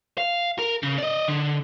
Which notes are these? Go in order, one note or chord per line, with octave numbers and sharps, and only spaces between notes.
F5
A#4
C#3
D5 D#5
D3